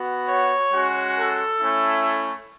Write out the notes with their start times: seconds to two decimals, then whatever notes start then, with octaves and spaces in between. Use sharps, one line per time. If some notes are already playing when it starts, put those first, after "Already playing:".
Already playing: B3 F#4
0.28 C#5
0.72 G#3 C#4 F#4
1.17 A4
1.61 A3 C#4 E4